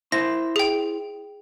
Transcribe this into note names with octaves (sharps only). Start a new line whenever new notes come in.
E4 C5 A#6
G#4 G5